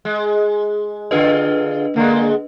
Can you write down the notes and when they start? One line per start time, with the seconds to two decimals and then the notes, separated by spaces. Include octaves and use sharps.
0.05 G#3
1.11 D3 D4 F4 G#4 B4 D#5
1.96 D3 G#3 A#3